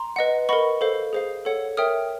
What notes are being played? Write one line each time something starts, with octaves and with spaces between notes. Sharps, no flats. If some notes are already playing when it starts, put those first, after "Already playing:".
Already playing: A#5 C6
B4 D#5 F#5
A#4 D#5 F#5 B5 C#6
A4 C5 F5
G#4 C5 F5
A4 C#5 F#5
A#4 C#5 E5 G5 D#6 F6